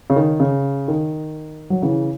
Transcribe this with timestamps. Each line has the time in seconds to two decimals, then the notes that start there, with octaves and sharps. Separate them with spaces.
0.10 C#3
0.16 D#3
0.40 C#3
0.88 D#3
1.70 F#3
1.82 C#3 E3